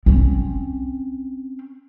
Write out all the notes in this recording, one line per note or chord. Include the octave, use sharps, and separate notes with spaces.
C4 C#4